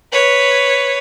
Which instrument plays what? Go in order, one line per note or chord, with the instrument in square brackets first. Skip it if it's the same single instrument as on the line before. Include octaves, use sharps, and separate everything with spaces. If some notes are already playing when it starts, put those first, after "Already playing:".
[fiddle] B4 C#5